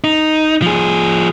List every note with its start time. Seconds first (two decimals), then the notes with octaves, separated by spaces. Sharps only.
0.04 D#4
0.62 F3 G#4